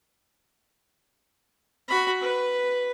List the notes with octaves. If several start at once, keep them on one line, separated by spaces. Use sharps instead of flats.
F#4 B5
B4